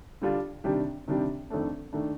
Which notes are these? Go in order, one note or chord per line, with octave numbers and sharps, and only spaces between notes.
D3 G3 D4 F4
C3 D#3 G3 D4 G4
C3 D#3 G3 D4 G4
F2 D#3 A3 D4
D#3 A3 D4